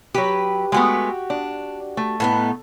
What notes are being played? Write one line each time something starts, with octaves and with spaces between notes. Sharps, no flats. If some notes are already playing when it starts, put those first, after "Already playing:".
F#3 G4 B4
G#3 A3 B3 F#4 G4
D4
A3
A2 B3 D#4